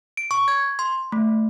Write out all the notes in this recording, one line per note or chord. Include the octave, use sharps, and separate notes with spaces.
D7
C#6
G#6
C6
A3